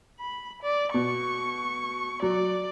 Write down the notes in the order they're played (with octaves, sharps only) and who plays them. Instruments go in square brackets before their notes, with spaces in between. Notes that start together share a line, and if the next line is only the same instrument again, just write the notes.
[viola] B5
D5
[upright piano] B2 [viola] C#6
[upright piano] F#3 [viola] D5